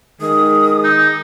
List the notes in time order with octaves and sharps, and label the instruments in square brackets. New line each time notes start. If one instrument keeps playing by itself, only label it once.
[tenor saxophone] D#3 [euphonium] G#3 [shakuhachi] D#6
[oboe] D#4